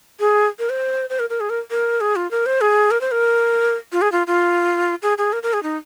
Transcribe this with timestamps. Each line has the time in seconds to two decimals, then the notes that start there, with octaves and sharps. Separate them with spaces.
0.20 G#4
0.59 A#4
0.70 C5
1.10 C5
1.19 A#4
1.30 A#4
1.40 G#4
1.50 A#4
1.71 A#4
2.01 G#4
2.16 F4
2.31 A#4
2.46 C5
2.61 G#4
2.91 A#4
3.01 C5
3.12 A#4
3.92 F4
4.02 G#4
4.12 F4
4.27 F4
5.02 G#4
5.18 G#4
5.33 A#4
5.43 A#4
5.53 G#4
5.63 D#4